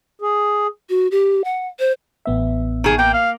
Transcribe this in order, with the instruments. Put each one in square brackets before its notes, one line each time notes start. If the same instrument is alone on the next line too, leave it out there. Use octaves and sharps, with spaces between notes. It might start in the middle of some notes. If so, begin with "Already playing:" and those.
[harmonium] G#4
[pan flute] F#4
G4
F#5
C5
[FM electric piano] A1 B3 E5
[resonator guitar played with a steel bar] D#3 G#4
[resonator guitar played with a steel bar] A#3 [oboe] G5
[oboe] F5